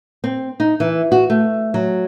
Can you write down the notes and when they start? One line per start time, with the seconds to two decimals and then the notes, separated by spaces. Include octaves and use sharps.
0.24 C4
0.60 D#4
0.80 E3
1.12 F#4
1.30 A3
1.74 F#3